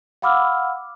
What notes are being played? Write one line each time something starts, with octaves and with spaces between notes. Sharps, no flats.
F5 F#5 B5 D6 E6 F6